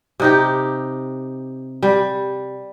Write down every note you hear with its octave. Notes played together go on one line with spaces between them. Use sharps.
C3 D#4 G4
G3